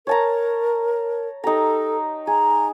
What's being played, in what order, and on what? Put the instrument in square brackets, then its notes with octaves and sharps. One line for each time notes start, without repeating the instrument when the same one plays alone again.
[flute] A#4 [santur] C#5 A5 A#5
[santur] D#4 G4 A#5 [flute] A4
[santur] G#4 [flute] A#5